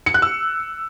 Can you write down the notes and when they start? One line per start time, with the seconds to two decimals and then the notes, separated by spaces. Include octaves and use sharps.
0.06 C#7
0.14 F#6
0.22 E6